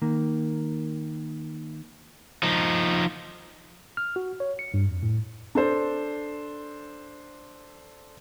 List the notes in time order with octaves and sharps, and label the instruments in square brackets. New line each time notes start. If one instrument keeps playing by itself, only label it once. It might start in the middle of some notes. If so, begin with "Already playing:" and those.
[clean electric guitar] D#3 A#3
[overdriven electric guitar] F3 D#4
[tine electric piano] F6
F#4
C#5
C#7
G2
F2
A2
[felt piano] D4 A4 C5